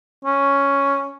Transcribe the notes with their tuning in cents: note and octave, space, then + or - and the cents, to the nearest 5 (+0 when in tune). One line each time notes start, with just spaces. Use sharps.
C#4 +0